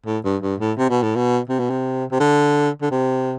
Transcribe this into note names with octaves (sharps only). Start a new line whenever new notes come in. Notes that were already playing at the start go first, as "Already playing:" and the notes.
A2
G2
G2
A2
C3
B2
A2
B2
C3
B2
C3
C3
D3
D3
C3